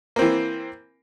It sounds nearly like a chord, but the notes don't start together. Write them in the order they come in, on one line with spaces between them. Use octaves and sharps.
A#3 C4 E3